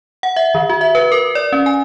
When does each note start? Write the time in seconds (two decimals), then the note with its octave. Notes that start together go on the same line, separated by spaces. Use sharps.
0.23 F#5
0.36 E5
0.55 D#3
0.70 F#4
0.81 E5
0.95 B4
1.12 A#4
1.35 D5
1.53 C#4
1.66 G#5